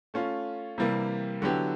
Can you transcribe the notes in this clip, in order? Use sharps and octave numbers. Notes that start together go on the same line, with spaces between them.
A3 C#4 F4
C3 E3 G3 A#3
D3 F#3 B3 E4 G4